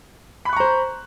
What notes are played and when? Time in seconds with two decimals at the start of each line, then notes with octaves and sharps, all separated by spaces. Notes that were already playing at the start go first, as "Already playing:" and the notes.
0.45 B5
0.49 F#6
0.53 C#6
0.56 A#5
0.60 C5